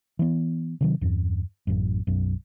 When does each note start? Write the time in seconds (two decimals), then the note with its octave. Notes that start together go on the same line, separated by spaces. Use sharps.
0.19 E3 B3
0.81 C3 D#3 F#3
1.01 E2 G2
1.67 A1 F#2
2.07 B1 F#2